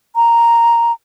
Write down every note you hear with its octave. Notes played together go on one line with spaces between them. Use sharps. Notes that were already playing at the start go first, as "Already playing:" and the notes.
A#5